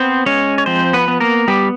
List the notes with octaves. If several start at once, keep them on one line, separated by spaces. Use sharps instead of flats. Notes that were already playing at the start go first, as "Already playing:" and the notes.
Already playing: B3 C4 C5
G#3 C#4 C#5
C#5
F3 C4 C5
B3 B4
B3
A#3 A#4
G3 B3 G4